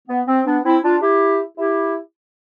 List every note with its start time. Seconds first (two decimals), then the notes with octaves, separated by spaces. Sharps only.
0.08 B3
0.28 C4
0.46 B3 D4
0.64 C4 E4
0.84 D4 F4
1.02 E4 G4
1.58 E4 G4